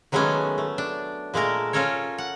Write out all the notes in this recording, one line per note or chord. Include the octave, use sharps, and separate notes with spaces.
D#3 F#3 G#3 A3 B3 C#4
A3
D4
A#2 G#3 A3 A#4
C#4 F4 A4 A#4 C#5
F#5